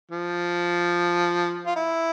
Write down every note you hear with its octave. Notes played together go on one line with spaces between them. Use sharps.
F3
F4
E4